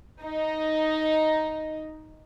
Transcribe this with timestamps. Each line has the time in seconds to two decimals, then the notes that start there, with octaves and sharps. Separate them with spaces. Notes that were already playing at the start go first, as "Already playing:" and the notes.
0.24 D#4